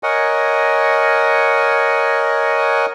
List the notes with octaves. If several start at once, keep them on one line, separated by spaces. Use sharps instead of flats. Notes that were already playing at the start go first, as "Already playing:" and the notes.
A#4 C#5 D#5 F#5 G#5